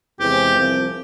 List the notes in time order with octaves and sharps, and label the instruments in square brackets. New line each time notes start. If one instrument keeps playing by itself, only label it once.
[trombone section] E2 C3 E3 G#3 C4 [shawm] G4
[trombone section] C2 C3 F3